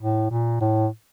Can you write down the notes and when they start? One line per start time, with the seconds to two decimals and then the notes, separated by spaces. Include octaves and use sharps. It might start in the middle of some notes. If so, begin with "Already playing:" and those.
0.02 A2
0.31 A#2
0.61 A2